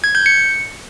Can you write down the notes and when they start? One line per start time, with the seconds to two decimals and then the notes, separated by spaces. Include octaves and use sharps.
0.04 G#6
0.15 G6
0.26 C#7